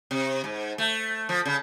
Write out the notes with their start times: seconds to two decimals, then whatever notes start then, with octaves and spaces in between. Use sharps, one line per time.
0.11 C3
0.44 G#2
0.78 A3
1.29 F3
1.45 C#3